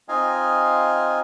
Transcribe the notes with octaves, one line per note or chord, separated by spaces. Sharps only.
C4 D#4 F4 D#5 F5 G#5